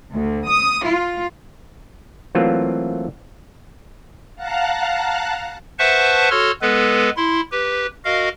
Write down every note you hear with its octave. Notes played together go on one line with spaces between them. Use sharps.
D2
D#6
F4
E3 F#3 A3 A#3 C4 F4
F5 F#5 A5 A#5 F#6
B4 C5 E5 F#5 A5 C#6
F#4 A4 C#5 C6 F6
G#3 B3 A4 B4
E4 C6
G4 B4
F#4 A#4 D#5 F5